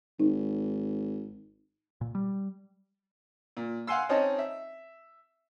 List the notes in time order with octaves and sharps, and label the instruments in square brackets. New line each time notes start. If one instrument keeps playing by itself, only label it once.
[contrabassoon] G#1 [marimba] D#4
[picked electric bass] A#2
G3
[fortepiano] A#2
F5 F#5 G#5 C6 E6
C4 C#4 D#4 C#5 D#5 A5
E5